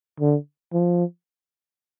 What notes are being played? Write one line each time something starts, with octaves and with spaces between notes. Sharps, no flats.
D3
F3